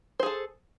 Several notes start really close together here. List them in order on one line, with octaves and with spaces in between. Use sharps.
C5 G#4 A4